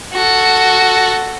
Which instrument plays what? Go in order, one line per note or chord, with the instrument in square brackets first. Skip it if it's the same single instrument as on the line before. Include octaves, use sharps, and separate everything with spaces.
[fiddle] F#4 A4